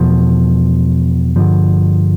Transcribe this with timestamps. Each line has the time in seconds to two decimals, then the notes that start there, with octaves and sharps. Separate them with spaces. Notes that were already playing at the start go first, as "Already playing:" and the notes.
Already playing: E2 B2 F3
1.36 G2 D3 F3